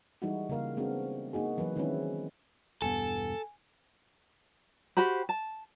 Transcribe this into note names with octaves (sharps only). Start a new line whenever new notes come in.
E3 G3 G#3 D#4 E4 F#4
C#3 A#3 A#4 F5
G#3 B3 C4 D4 F#4
A#3 D#4 F#4 G#4
E3 F#3 B4
D#3 G#3 C4 C#4 E4 B4
E1 G2 B3 A4 G#5
F#4 G4 C5 B5
A5